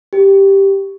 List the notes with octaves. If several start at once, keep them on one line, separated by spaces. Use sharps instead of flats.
G4